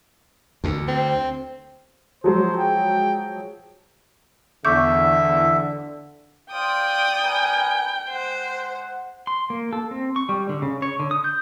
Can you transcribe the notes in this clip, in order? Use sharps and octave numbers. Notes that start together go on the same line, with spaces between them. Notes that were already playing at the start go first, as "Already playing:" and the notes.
D2 D3
C4
F3 F#3 G#3 C5
G5
E2 D3 E5 C#6 D6 G6
F4 C5 D5 F5 G5 D#6
A#4 B4 G#5
G#3 C5 F#5
C6
A#3
A4
C4
C#6
G3
D3
C#3
C#5
D3
D#6
G6